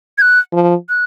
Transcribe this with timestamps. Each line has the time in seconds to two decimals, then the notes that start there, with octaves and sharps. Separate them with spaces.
0.18 G#6
0.22 F#6
0.53 F3
0.89 F#6